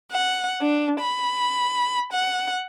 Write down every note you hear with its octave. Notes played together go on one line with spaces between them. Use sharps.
F#5
D4
B5
F#5